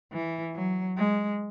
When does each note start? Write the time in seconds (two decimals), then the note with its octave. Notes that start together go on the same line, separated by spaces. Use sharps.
0.12 E3
0.55 F#3
0.97 G#3